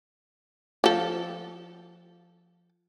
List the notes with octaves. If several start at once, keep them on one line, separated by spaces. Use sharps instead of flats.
F3 A4